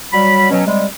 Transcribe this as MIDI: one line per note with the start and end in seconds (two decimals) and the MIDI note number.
0.13 0.48 54
0.13 0.48 55
0.13 0.48 83
0.51 0.65 47
0.51 0.65 54
0.51 0.65 61
0.66 0.84 48
0.66 0.84 55
0.66 0.84 56